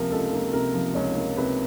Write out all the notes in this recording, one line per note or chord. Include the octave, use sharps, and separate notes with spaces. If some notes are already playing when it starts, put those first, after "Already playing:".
Already playing: C#2 C3 F3 A#3 A#4
C#2 A4
A#3
C3 A#4
F3
C#2 C#5
A#3
C3 B4